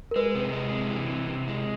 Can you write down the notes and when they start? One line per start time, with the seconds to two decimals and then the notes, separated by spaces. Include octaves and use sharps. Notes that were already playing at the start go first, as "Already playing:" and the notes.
0.11 A#4
0.16 G#3 B4
0.35 C3
0.53 G#3
0.72 C3
0.90 E3
1.09 C3
1.29 C3
1.48 G#3